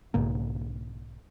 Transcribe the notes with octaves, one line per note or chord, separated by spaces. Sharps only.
B1 G#2 C#3 A#3